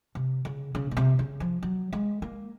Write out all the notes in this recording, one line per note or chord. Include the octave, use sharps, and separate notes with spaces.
C3
C#3
C#3
A#2
C3
C#3
F3
F#3
G#3
A#3